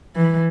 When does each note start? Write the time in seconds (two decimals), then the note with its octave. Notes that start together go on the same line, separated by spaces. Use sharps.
0.16 E3